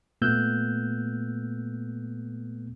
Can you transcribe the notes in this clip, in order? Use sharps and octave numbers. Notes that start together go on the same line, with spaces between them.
A#2 A3 B3 E6 F#6 G6